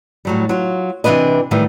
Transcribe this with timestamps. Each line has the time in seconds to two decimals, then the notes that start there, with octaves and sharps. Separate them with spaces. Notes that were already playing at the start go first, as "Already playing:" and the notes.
0.25 A2 F#3 G3
0.49 F#3 F4
1.04 C3 E3 G#3 D4 B4 D#5
1.51 A2 D#3 E3 G3